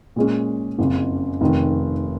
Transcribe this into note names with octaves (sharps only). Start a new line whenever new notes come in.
A#2 G#3 C#4
F#1 F2 C#3
F1 F2 D#3